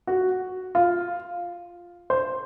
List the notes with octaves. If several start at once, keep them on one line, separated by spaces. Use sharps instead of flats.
F#4
F4
C5